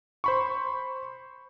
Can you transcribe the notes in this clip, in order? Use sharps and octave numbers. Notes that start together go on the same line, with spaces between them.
C5 B5 C#6